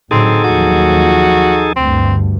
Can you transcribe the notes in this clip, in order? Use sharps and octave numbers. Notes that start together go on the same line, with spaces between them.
A2 D3 F#3 C4 D#4 G#4 A4
D#2 F3 F#3 F#4
D2 G2 C4